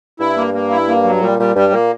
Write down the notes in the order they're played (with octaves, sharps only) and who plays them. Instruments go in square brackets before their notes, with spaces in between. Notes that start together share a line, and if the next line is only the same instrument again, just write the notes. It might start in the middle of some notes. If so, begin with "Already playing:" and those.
[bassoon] G2 [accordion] E4
[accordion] A#3
A#3
E4
A#3
F#3
[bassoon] A#2 [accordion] G3
[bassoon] A#2 [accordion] G3
[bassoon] G2 [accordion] G3
[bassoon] A#2 [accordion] A#3